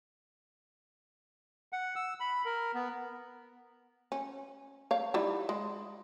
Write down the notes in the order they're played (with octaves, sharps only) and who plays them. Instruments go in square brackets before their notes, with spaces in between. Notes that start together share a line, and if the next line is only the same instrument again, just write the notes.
[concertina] F#5
E6
B5
A#4
B3
[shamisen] C#4
C#5 F5
G3 D#4 E4
G#3